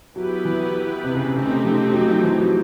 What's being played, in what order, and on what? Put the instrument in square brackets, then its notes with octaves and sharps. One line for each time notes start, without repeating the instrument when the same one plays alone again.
[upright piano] F#3 [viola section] B3 E4 G4 B4
[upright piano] E3
C3
C#3
C3
[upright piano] C#3 [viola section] A3 C4 D#4 G4
[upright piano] C3
F3
F#3
F3
E3
F#3